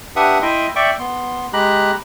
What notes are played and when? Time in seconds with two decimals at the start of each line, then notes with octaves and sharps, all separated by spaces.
0.16 D4 G4 B4 E5 F#5 D#6
0.42 E4 D#5 E5 G5 C6
0.76 D5 E5 G5 C#6 D6
1.00 B3 C6
1.53 G#3 G4 A#5 B5 F#6